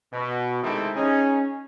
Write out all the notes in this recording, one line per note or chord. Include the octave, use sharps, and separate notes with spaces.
B2
C3 D#3 G#3 A3 C4 E4
C#4 D#4 G#4